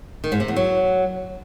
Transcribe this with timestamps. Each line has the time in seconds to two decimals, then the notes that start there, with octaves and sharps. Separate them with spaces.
0.24 D#3
0.32 G#2
0.40 C3
0.48 E2
0.56 F#3